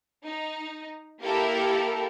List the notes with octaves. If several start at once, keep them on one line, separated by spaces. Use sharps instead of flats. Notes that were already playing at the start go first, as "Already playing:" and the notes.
D#4
A#3 E4 G4 A4 A#4